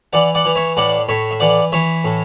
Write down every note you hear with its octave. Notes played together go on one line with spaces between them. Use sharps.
E3 D5 F#5
D5 F#5
E3
C#5 E5
A2 D5 F#5
A2 C#5 E5
E5
E3 D5 F#5
E3 C#5 E5
A2